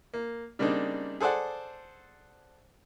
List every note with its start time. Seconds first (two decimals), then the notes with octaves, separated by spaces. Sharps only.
0.14 A#3
0.59 C#3 G3 A#3 C4 D4 D#4
1.20 G#4 A4 C5 D5 F#5